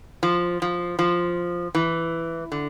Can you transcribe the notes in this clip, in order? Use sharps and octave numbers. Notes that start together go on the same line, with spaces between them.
F3
F3
F3
E3
D3